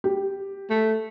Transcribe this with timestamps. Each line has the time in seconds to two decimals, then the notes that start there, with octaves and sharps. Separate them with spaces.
0.04 G4
0.70 A3